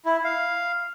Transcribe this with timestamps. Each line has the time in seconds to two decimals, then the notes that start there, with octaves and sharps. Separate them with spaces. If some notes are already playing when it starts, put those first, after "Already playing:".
0.05 E4
0.24 F5